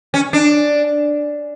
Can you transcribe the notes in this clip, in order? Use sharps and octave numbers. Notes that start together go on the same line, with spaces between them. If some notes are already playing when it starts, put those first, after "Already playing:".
C#4
D4